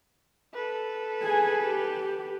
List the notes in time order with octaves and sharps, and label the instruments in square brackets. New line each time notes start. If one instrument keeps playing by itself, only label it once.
[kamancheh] A4 B4
[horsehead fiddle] G#4 G#5
G4